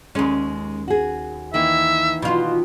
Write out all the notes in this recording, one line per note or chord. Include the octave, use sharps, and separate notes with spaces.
D#2 G#3 C#4
F#4 G#4
D#3 E3 A#3 E5
B2 F4